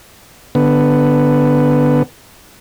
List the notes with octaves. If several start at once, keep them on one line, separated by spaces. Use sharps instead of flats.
D3 B3